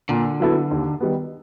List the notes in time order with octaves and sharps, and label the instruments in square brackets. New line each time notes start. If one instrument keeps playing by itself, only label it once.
[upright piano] A#2 [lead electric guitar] D3
[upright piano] F#3 B3 E4 A4
D#2
D#3 G3 B3